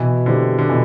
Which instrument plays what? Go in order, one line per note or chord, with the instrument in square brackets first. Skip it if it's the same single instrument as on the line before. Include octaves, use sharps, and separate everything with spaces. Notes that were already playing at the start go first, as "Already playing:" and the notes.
Already playing: [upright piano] B2 [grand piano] E3
[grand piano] D3 [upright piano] G3 C4 E4
[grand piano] D3
[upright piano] B2 [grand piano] E3